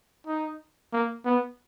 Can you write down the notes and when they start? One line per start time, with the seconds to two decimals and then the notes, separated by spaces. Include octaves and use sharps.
0.27 D#4
0.93 A#3
1.26 B3